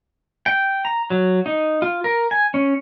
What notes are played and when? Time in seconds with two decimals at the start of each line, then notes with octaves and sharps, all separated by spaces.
0.46 G5
0.85 A#5
1.10 F#3
1.46 D#4
1.82 F4
2.04 A#4
2.31 G#5
2.54 C#4